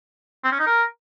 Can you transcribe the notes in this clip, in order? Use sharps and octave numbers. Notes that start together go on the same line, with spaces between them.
C4
C#4
D#4
A#4